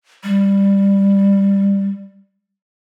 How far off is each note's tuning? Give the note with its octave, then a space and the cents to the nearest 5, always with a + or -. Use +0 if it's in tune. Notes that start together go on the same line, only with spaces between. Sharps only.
G3 +10